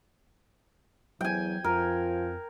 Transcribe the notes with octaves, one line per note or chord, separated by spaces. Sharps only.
E2 F#3 G5 G#5
F2 F3 A#4